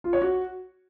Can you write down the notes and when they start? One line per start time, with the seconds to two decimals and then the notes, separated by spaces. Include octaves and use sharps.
0.04 F4
0.13 C#5
0.22 F#4